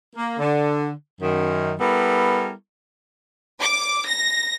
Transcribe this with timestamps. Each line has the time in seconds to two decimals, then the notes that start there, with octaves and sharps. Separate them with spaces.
0.16 A#3
0.39 D3
1.21 F#2 D#3
1.79 G3 B3 E4 A4 A#4
3.60 D6
4.06 A#6